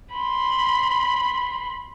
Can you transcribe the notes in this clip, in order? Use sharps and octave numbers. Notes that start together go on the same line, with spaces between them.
B5 C6